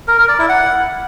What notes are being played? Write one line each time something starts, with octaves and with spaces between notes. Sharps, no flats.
A#4
A#4
D5
E4
F#5